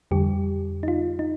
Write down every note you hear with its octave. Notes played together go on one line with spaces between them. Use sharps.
F2 D3 G3 G4
D#4
F4
D#4